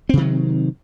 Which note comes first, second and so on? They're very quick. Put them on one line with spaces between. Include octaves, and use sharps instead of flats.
C4 C3 D#3 F#3